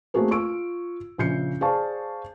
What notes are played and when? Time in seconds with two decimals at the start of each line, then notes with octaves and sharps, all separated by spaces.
0.14 A3 A#3 C4 F#4 G#4 A#4
0.31 F4 C#6 E6 D7
1.18 A#1 C#3 G6 C7 C#7
1.61 G#4 C5 D5 F5 A5 C#6